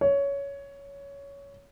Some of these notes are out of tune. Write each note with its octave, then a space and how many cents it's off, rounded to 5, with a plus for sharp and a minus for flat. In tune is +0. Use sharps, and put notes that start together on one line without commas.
C#5 +15